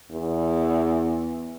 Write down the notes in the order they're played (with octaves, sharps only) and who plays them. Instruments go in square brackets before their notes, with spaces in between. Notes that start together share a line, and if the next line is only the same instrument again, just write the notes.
[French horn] E2